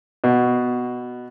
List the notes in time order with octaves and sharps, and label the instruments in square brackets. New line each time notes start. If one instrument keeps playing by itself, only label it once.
[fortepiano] B2